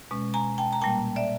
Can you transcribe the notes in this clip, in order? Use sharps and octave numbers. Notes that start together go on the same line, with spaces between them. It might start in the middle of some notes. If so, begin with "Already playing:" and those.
B2 G#3 C#4
G#5 A#5
G5 A5
A#5
A#2 G3 A#3 G5 A5
D5 E5